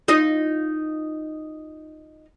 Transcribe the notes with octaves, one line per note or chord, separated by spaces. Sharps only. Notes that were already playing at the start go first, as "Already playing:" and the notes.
D#4 F4 D#5